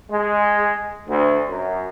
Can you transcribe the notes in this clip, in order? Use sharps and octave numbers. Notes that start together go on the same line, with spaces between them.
G#3
D2
F#2